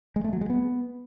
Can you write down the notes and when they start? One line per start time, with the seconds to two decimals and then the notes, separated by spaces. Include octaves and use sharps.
0.16 G#3
0.24 A3
0.33 F#3
0.41 G#3
0.50 B3